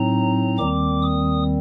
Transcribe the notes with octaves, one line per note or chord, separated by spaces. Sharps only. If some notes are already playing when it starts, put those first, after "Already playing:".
Already playing: A2 F#3 C4 D#4 A#5
D#2 D#3 G3 C4 D6
D#6